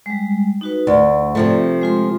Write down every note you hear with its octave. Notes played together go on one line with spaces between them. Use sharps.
G3 G#3
D#4 F#4 B4
D2 D5
C3 F3 A3
G#3 F4 C6